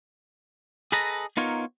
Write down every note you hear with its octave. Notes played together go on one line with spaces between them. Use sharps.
G#4 A4 B4 D#5 A#5
B3 D#4 F4 A#4 C#5